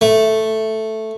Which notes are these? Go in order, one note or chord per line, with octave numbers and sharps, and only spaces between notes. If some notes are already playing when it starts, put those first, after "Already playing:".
A3